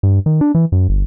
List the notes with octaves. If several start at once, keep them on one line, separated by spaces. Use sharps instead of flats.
G2
D#3
D4
E3
F#2
G1